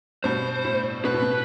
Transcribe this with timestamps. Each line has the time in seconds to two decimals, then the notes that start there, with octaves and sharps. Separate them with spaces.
0.24 G2 B2 C5
0.64 A2
1.05 B2 B4
1.14 A2
1.23 B2